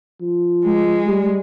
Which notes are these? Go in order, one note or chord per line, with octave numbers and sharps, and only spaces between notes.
F3
G#3
G3